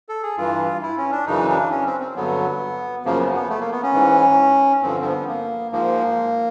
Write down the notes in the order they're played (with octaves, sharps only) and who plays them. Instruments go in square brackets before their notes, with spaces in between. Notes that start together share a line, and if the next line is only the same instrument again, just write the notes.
[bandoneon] A4
G#4
G2 E3 F4
E4
C#4
D4
F#2 C#3 E3 D#4
D4
C#4
C4
C4
G2 D3 F#3 B3
F#2 C#3 F3 A#3
B3
B3
A3
A#3
B3
C#4
G#2 E3
G2 D3 F3 C4
C4
B3
A#3
G#2 F3 A#3